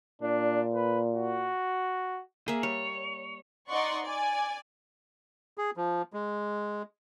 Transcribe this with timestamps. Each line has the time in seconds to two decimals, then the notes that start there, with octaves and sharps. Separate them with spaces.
0.22 A#2 D4
0.74 B4
1.14 F#4
2.48 A#3 G#4 E5
2.63 G3 C#5
3.68 D#4 D5 D#5 F#5 C6 C#6
4.04 D5 G#5
5.58 G#4
5.77 F3
6.13 G#3